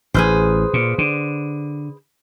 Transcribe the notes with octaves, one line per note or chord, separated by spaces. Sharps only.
A1 G#4 B4 C5
A#2
D3